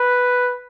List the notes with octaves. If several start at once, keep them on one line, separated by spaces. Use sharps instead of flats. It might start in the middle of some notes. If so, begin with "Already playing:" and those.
Already playing: B4